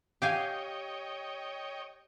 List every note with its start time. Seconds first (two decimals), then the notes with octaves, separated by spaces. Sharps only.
0.22 G4 C#5 D#5 F5 G5 G#5